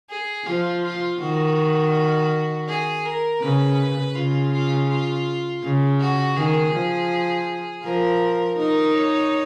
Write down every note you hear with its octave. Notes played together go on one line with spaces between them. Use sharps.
G#4
F3 F4
F4
D#3 F#4
G#4
A#4
C#3 B4
C#3 F4
F4
F4
C#3
F#4
D#3 G#4
F3
F3 A#4
D#4 A#4
C#5